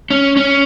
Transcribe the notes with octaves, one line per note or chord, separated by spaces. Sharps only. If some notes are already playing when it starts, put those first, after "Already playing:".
C#4
C#4